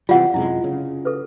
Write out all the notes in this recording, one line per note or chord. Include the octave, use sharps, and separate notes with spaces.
C3 E3 G3 F4 F#5
F#2 C3 G#3 E4
C#3
A4 B4